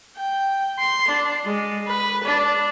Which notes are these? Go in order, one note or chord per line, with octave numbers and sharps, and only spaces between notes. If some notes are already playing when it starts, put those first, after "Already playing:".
G5
C6
D4
G#3
B4
D4